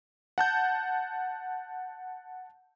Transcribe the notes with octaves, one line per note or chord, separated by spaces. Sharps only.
F#5 A5 G6